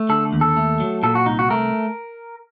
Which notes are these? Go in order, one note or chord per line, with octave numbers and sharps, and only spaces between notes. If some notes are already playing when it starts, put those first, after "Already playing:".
Already playing: A3
D3 A4
D#2
A4
A3
F#3
A#2 A4
F#4
C2 D#4
F#4
A3 A#4